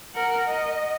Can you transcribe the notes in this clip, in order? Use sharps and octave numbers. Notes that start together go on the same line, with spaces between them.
A#4 F#5
D#5